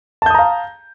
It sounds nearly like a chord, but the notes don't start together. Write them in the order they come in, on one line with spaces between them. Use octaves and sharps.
A5 G6 D#6 A#5 F5